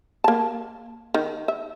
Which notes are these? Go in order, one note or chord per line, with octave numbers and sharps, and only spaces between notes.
A#3 A5
D#3
E5